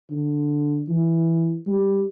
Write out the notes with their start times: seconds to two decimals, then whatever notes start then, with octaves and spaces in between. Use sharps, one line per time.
0.11 D3
0.89 E3
1.67 G3